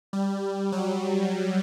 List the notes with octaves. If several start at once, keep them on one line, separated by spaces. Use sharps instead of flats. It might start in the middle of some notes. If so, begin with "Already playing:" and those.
G3
F#3